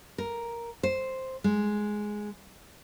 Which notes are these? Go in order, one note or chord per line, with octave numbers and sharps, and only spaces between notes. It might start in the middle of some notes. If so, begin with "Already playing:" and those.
A#4
C5
G#3